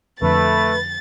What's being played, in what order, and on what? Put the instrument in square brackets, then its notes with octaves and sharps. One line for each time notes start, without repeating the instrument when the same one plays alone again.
[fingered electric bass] F2 D3 [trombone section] A3 [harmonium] B4 [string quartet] A6